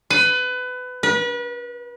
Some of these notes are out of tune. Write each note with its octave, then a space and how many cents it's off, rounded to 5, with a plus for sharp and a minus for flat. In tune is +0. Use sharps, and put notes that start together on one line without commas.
B4 +25
B4 -35